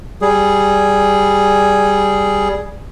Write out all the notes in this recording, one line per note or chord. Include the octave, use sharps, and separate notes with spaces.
G3 G#4